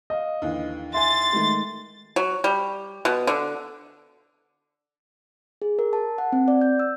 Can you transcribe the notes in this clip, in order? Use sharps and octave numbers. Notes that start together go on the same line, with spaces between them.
D#5 F5
D#2 D3 E3
E5 G#5 C6 A6
D#3 G#3 A3
F#3
G3
B2
D3
G#4
A#4
A5
F#5
C4
D5
G6
E6